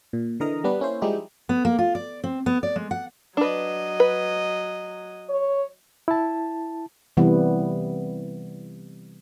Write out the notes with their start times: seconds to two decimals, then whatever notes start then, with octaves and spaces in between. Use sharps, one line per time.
0.13 A#2
0.40 D3 E3 A#4 D#5 A#5
0.64 G3 B3 D4 B4
0.80 A#3 C#4 E4 C5
1.02 F3 G3 G#3 D#4 E4 G4
1.49 B3
1.65 A#3
1.79 F4
1.95 D5
2.24 C4
2.46 B3
2.63 D5
2.76 G#3
2.91 F#5
3.37 F#3 D4 B4 D#5
4.00 B4
5.29 C#5
6.08 E4 A5
7.17 C3 E3 G3 B3